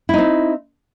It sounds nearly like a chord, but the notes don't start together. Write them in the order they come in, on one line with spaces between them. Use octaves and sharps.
E4 D#4 C4